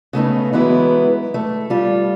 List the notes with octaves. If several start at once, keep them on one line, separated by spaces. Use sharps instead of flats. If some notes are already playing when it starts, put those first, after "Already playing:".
C#3 A3 B3 D#4
E3 F#3 G#3 B3 E4
A3
G3 F4